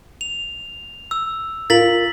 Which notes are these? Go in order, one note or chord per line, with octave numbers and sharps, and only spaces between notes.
F7
E6
F4 A#4 A6 B6 F#7